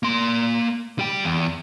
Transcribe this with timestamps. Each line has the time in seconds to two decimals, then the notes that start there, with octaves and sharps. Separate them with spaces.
0.03 A#3 C6
0.99 G3 G5
1.24 E2